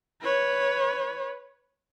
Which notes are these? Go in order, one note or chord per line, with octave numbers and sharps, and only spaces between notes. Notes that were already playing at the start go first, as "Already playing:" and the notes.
B4 C#5